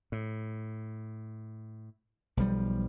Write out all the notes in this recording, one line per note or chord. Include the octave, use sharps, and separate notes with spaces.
A2
B1 F3 G3